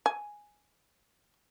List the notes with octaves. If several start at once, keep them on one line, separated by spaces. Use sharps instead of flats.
G#5